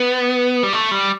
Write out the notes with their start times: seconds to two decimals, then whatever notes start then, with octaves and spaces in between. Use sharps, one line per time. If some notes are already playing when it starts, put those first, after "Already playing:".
Already playing: B3
0.63 G3
0.73 A3
0.91 G3